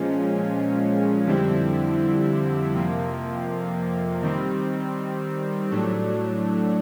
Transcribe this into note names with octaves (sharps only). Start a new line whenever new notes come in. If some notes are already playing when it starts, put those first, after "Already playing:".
Already playing: A#2 F3 G#3 C#4
F2 D3 G3 C4 E4
F2 C3 F3 A#3
D#3 G3 C4
A2 F#3 A3 D4